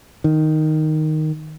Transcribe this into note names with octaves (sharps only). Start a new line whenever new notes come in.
D#3